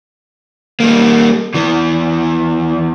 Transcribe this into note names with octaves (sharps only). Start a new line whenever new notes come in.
G3 A#3
E2 E3